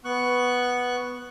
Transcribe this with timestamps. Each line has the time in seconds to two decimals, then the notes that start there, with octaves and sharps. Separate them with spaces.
0.05 B3 C#6 F#6